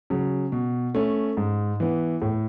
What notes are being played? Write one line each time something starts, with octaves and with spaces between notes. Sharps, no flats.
C#3 F#3
B2
A3 C#4
G#2
E3 B3
A2